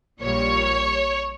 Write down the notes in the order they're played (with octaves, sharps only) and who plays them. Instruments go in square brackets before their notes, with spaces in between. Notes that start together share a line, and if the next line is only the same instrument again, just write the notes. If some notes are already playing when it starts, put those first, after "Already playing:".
[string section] A#1 A#2 G3 C#5